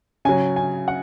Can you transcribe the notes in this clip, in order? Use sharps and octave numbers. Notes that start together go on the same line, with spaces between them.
C#3 F#3 G#5
G#5
F#5